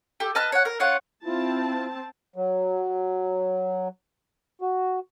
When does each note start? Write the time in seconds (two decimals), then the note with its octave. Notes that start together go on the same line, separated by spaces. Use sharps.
0.20 G4 A4
0.35 B4 D#5 A5 F6
0.52 C#5 F#5
0.65 A#4
0.80 C#4 F4 C#5 F#5
1.24 C4 E4 F4 A5
2.36 F#3
4.61 F#4